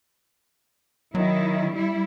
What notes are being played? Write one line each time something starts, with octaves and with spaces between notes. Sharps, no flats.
D#3 F#3 E4
G3 E4